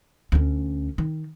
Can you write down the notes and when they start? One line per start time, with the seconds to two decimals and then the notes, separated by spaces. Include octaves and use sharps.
0.32 D2 C#4
0.98 D#3